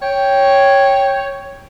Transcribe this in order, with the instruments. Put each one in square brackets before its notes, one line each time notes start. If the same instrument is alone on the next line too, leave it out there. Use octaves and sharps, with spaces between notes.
[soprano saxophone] C#5 [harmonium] G5